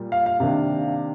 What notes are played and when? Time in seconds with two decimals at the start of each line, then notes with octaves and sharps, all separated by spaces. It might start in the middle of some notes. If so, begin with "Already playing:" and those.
Already playing: A#2 G3
0.12 F5
0.26 F5
0.40 C3 D#3 A#3 D4